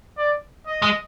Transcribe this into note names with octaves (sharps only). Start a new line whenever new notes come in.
D5
D#5
G#3